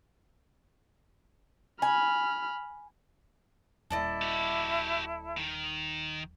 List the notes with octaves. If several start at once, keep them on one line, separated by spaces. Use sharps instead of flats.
G#5 B5 F6
D#1 D#2 E4 A4 D5 D#5
F#4 G4
D#3